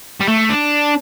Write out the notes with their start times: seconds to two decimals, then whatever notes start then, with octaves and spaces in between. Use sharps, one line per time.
0.20 G3
0.28 A3
0.49 D4